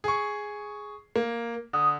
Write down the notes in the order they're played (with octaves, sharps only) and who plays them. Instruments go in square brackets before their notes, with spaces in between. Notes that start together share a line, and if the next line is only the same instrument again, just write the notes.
[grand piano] G#4 C#6
A#3
[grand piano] D3 [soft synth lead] D#6